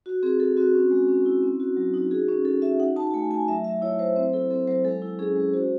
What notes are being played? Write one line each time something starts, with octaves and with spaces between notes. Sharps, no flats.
F#4
C4 G#4
C4 A4
C4 F#4
C#4
G#3
C#4
E4
C4
F#4
F#3
D#4
F#4 G#4
C#4
C#4 A4
F#4 E5
D#4 F#5
D#4 A5
A5
A3 G#5
A3 G#5
F#3 E5
F#3 E5
E4 C#5
F#3 C5
C4 C5
E4 A4
C4 A4
F#3 C5
G#3 A4
E4
C#4 G#4
G#3
F#4 C5